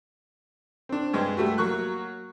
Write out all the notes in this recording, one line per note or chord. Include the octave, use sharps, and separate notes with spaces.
C4 D4
G2 G#3
G3 A3 F#4
F#3 A#3 C#6 F#6